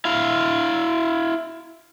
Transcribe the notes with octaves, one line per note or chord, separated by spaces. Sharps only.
E4 F5